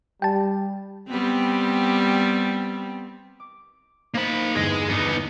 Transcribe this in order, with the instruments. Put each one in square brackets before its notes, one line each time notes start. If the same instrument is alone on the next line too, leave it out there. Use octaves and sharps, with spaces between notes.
[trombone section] G3 [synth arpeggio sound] G5 A5
[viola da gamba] G3 B3 C4
[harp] D6
[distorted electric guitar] A#3 B5 [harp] D#4 C5
[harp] G1 E2 G2 [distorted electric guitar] G#4 D#5
[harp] G#2 D4 [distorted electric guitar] B3 D#4